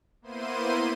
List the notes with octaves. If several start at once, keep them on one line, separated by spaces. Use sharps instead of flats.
A#3 B3 E4 C5 C6 D#7